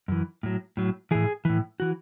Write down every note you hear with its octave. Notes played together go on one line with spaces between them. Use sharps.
F#2 E3
A2 F#3
A2 F#3
A2 E3 G#4
A2 E3
E3 F#4